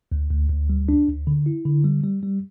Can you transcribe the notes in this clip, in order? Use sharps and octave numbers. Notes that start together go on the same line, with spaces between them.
D2
D2
D2
G3
D4
D2
D3
E4
D3
G3
G3
G3